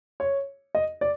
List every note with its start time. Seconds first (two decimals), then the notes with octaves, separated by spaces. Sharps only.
0.20 C#5
0.75 D#5
1.01 D5